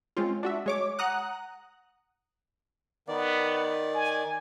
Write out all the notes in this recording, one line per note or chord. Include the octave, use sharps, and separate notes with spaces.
G#3 C4 C#4 F4
D4 F#4 E5
G#3 C#5 D6
F#5 A#5 D#6 F#6
D#3 B3 D5
G#5